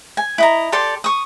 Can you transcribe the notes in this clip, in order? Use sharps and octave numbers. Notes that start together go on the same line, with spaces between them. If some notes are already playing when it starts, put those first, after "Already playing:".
G#5
E4 D#5 A#5
G4 A4 D5 C6
C#6 D#6